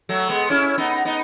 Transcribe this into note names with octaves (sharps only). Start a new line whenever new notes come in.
F#3 A3
G#3 B3
C#4 E4
B3 D#4
B3 D#4